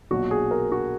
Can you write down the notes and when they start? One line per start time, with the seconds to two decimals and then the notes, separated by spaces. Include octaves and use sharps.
0.11 B1 A#2 F#3 F#4
0.31 G#4
0.51 A#4
0.72 F#4